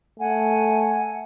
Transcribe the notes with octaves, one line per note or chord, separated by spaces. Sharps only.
A3 F#5 G#5